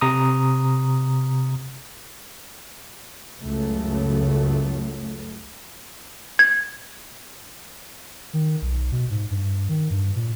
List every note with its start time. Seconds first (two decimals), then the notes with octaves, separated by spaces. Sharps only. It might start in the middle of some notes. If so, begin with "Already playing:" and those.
0.01 C3 A#5 D#6
3.41 C#2 F#2 C#3 F#3 A3
6.39 G#6
8.33 D#3
8.62 B1
8.92 B2
9.10 G#2
9.30 G2
9.69 D#3
9.90 G2
10.16 A#2